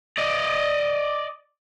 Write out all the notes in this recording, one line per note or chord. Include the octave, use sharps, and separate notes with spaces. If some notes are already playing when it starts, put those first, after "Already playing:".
D5 D#5